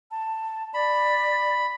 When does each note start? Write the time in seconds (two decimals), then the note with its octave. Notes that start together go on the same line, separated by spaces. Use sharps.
0.11 A5
0.74 D5 B5